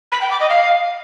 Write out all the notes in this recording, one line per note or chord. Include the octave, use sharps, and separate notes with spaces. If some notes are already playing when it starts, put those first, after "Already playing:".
B5
G5
D6
D#5
F5